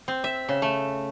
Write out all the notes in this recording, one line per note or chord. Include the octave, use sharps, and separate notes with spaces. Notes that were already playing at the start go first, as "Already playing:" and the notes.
C4
E5
C#3
A3